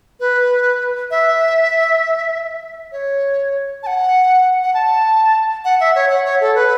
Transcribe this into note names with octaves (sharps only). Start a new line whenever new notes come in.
B4
E5
C#5
A5
F#5
F#5
A5
F#5
E5
C#5
F#5
C#5
A4
B4